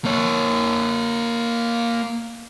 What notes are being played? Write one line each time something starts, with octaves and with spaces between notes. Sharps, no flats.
A#3 C#5